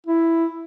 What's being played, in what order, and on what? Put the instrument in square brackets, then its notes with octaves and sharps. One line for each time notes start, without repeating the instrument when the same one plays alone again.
[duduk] E4